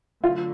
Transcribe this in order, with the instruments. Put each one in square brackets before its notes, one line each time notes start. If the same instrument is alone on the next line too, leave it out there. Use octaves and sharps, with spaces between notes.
[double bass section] D3 F#3 A3 [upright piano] F4